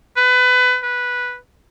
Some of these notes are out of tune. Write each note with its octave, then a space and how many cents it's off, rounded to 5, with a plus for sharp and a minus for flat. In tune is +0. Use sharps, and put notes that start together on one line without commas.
B4 +20
B4 -5